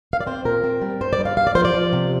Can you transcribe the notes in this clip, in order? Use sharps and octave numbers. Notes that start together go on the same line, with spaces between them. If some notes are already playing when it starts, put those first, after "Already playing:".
F5
D5
C4 C5
A#2 A#4
C4
G3
G2 C5
D5
G2
F5
G2 F5
D5
F3 C5
D5
F3
C3